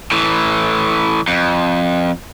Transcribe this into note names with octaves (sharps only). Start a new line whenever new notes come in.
A2 E3
F2